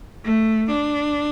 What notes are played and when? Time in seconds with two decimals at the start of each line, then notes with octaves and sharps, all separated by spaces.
0.25 A3
0.71 D4